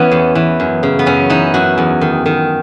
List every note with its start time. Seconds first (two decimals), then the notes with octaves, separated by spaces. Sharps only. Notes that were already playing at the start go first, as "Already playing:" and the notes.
Already playing: E3 B3 C#4
0.11 E2
0.35 E3
0.60 F#2
0.83 C#3
0.99 B3
1.06 F#2 C#4
1.30 E3 D#4
1.54 F#2 F#4
1.78 E2
2.01 D#3
2.26 D#3